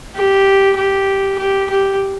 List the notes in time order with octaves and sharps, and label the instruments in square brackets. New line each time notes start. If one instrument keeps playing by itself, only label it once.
[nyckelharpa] G4
G4
G4
G4